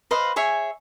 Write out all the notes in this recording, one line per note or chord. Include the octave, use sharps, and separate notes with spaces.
B4 C5 D#5 F5
G#4 C#5 E5 G#5